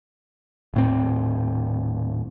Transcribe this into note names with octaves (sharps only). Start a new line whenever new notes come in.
D#1 A2 C4